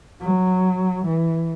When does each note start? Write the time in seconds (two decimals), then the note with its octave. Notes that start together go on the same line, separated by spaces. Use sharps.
0.20 F#3
1.06 E3